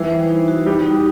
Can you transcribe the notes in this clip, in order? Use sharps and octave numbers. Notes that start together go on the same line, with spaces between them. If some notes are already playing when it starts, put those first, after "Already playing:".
Already playing: E3 G3 E4
C5
D#4
F#4
G3 D#4 G4
D#4
G4